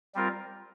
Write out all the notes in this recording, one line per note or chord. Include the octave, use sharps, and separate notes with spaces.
G3 C4 F4 A#4